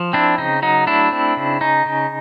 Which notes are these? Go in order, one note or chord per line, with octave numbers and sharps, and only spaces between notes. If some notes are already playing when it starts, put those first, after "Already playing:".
Already playing: F3
C4 D4 E4
C#3 D#4
F#3 D#4
A3 D4 E4
C4
C#3
C#4 D#4
C#3